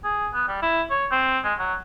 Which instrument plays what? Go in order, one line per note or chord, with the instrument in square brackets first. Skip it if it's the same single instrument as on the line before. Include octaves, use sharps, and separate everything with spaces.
[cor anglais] G#4
B3
G3
E4
C#5
C4
G#3
F#3